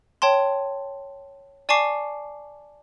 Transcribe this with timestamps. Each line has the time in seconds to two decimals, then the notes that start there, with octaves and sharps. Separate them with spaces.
0.22 C#5 G5 A5 C6
1.69 D5 G#5 A5 C#6 D6 C7